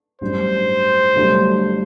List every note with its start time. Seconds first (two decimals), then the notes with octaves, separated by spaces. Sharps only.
0.21 A1 G2 F#3 C5
1.16 G1 G2 F#3 A3